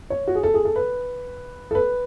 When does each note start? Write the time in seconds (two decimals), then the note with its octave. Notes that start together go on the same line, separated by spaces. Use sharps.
0.10 C#5
0.27 F#4
0.35 G#4
0.43 A4
0.54 G#4
0.65 A4
0.76 B4
1.71 A4
1.75 B4